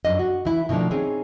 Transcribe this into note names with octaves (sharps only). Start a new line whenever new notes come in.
F#2 D4 D#5
F#4
E3 E4
B2 D#3 F3 A3 D4
C4 C#4 D#4 G#4